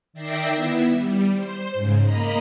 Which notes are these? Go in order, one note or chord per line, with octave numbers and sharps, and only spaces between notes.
D#3 D5 E5 G5 A#6 C7
B3 E4 E5
G3
C5
G#2 C#3
A#3 D#5 A#5 B5